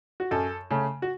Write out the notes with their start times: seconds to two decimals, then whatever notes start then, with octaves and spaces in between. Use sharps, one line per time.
0.20 F#4
0.31 F#2 A4
0.70 C#3 A3 C#4
1.02 F#4